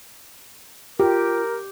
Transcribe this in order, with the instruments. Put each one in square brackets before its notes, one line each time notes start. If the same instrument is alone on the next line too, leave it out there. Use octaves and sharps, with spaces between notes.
[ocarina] F4 [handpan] G4 [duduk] A#4